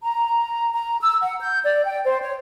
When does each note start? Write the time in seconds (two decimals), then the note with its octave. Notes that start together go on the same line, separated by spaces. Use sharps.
0.02 A#5
0.72 A#5
1.01 E6
1.23 F#5
1.40 G6
1.65 D5
1.85 G5
2.04 C5
2.21 C#5